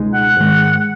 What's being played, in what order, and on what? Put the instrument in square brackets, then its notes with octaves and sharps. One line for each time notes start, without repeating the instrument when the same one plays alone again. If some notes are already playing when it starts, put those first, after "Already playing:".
Already playing: [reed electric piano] C#2 B2 G#3 D#4
[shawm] F#5
[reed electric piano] G#2 D#3 G#3